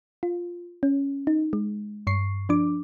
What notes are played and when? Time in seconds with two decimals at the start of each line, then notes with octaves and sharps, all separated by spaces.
0.23 F4
0.83 C#4
1.27 D#4
1.53 G#3
2.07 G2 C#6 C7
2.49 F3 D4 D6